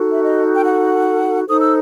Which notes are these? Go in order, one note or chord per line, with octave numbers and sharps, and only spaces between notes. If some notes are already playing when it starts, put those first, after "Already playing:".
Already playing: D#4 F#4 A4
E5
D#5
G5
F#5
D#4 A4 C5 D#6
E6